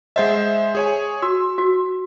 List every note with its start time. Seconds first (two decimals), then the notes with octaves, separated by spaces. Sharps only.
0.16 G#3 C5 D#5 E5 F#5
0.75 G#4 C#5 G#5
1.22 F#4 E6
1.58 F#4